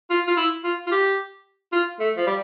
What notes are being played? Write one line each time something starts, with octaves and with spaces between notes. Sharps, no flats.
F4
F4
E4
F4
F4
G4
F4
A3
F3
G3